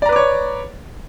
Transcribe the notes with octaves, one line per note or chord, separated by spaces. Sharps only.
B4 C#5 D5 A#5 D6